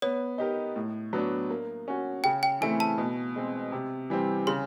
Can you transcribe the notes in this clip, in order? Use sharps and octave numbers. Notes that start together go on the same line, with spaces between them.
B3 C#5
D#4 G4 A#4
A2
F#3 B3 D4
A#3
C#4 F#4
C#3 G5
G5
E3 A3 C4 E4 G#5
A5
B2
G#3 C4
C3
E3 G3 C4
C#3 C6